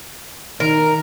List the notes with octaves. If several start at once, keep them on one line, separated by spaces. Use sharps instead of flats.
D#3 A#4